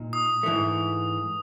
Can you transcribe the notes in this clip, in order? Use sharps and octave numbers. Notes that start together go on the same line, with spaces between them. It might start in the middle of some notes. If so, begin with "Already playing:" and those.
Already playing: A#2 D#4
D#6
G#2 E3 A3